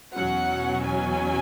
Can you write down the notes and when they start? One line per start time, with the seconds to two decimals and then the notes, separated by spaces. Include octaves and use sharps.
0.14 E2 B2 F#3 C#4 F#5
0.85 G#5